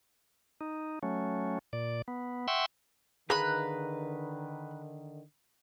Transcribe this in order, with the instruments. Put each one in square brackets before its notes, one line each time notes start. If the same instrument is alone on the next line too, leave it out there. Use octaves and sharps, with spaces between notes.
[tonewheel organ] D#4
F#3 A3 C#4
A#2 D5
B3
E5 F#5 G5 C6 C#6 E6
[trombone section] D3 D#3 [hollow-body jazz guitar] G#4 F5 [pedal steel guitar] B4 A#5 [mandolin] B5 F#6